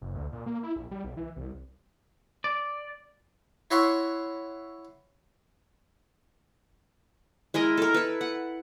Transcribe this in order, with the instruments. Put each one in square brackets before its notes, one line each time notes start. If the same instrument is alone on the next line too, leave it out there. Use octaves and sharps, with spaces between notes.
[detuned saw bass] F#1
D2
A#2
A#3
E4
A#1
G3
B1
E3
C2
[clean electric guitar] D5
[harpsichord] E4 F#4 C#5 E5 C6 C#6
[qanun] G#3 E4 A#4 D#5
A4 A#4
E4 B4
F#5